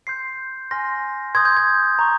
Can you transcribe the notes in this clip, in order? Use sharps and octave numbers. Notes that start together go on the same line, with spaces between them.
C6 G6 C7
G#5 C6 F6 A#6
C6 D#6 G6 G#6
G6
G#6
A#5 C#6